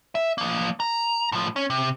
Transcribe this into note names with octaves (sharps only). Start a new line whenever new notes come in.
E5
F3 A#3
A#5
A2 F3
C#4
C3